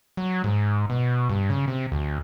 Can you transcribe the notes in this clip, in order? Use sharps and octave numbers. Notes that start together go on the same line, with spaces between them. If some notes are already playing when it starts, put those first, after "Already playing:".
F#3
G#2
B2
G2
C#3
C3
D2